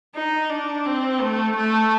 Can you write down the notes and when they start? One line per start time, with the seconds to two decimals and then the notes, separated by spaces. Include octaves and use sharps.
0.15 D#4
0.50 D4
0.86 C4
1.21 A3
1.56 A3